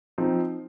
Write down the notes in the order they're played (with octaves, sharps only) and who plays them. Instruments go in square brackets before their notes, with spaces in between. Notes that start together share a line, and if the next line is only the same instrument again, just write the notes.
[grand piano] F3 C4 D#4